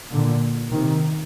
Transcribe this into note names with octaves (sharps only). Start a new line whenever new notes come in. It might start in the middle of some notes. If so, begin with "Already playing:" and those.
A#2 D3
C3 D#3